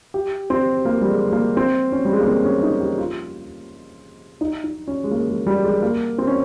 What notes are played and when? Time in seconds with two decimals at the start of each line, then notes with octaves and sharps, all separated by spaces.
0.14 G4
0.50 C4
0.85 A#3
1.01 G3
1.10 G#3
1.32 A#3
1.57 C4
1.92 C#4
2.05 G3
2.13 G#3
2.20 A#3
2.27 C4
2.45 C#4
2.63 D#4
2.81 G4
2.98 F4
4.41 D#4
4.64 D#4
4.88 C#4
5.04 G#3
5.11 A#3
5.29 G#3
5.47 G3
5.64 G#3
5.82 A#3
6.18 C4
6.27 C#4